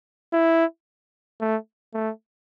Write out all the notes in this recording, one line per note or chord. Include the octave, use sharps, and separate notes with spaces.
E4
A3
A3